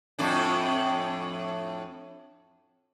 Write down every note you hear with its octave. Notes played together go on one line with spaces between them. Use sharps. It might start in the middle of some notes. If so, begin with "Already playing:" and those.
F2 A2 D4